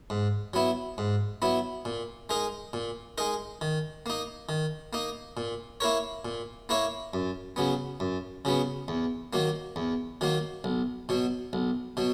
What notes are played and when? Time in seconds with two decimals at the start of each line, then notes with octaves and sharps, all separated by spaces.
0.10 G#2
0.54 F#3 B3 E4
0.98 G#2
1.42 F#3 B3 E4
1.85 A#2
2.29 G#3 D#4 A#4
2.73 A#2
3.18 G#3 D#4 A#4
3.61 D#3
4.06 A#3 D#4
4.49 D#3
4.93 A#3 D#4
5.37 A#2
5.80 A#3 E4 A#4 C#5
6.25 A#2
6.69 A#3 E4 A#4 C#5
7.14 F#2
7.56 C#3 F#3 B3
8.00 F#2
8.45 C#3 F#3 B3
8.88 E2
9.33 D#3 F#3 A#3
9.76 E2
10.21 D#3 F#3 A#3
10.64 B1
11.09 B2 F#3
11.53 B1
11.97 B2 F#3